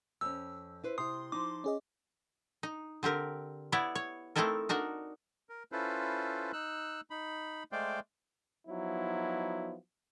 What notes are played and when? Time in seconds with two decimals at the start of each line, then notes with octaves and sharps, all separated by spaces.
0.21 F2 C#4 E6
0.84 E4 B4 C5
0.98 C3 E4 C6 D#6
1.32 F3 D#4 D6
1.64 C#4 G#4 D#5
2.63 D#4
3.03 D3 C4 G4 A#4
3.72 B3 E4 C#5 D5
3.95 C#5
4.36 A3 C4 D#4 E4 A4 A#4
4.69 D4 D#4 F#4 A#4
5.49 A#4
5.72 C#4 E4 F4 A4 B4 C5
6.53 D#4 E6 F#6
7.10 D#4 B5
7.72 G#3 A3 C5 D5 F5 G5
8.68 F3 F#3 B3 D#4 E4